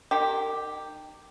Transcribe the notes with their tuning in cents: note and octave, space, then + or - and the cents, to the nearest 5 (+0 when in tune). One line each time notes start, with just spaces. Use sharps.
D#3 -35 G4 +0